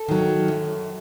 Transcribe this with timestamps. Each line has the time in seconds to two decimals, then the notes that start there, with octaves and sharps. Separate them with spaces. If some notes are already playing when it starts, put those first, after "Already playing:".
Already playing: A4
0.08 D#3 F#3
0.48 F#2